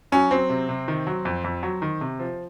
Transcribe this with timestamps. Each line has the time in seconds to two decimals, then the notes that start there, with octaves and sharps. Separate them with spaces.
0.12 F#3 C#4
0.31 F#3 C4
0.50 C3
0.69 C3
0.88 D#3
1.07 F#3
1.25 F2
1.44 F2
1.63 F#3
1.82 D#3
2.01 C3
2.19 F3